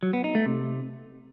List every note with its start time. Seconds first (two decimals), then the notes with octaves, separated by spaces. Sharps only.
0.03 F#3
0.13 B3
0.24 D#4
0.35 A3
0.46 C3